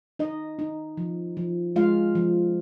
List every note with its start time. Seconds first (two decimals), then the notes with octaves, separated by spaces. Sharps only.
0.19 D#4 D#5
0.59 D#4
0.97 F3
1.37 F3
1.76 G#3 F4 F5
2.15 F3